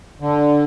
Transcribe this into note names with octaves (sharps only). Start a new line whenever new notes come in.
D3